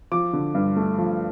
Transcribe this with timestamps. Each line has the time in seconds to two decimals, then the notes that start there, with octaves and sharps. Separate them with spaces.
0.12 F3 D6
0.33 D3
0.54 G2
0.76 A3
0.98 F3